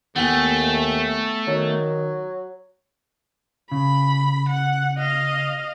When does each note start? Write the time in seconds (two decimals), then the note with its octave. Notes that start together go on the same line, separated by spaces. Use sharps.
0.16 D#2 A3 B3 G5 G#5
1.47 D#3 F#3
3.72 C#3 B5
4.49 F#5
4.98 D#5 F5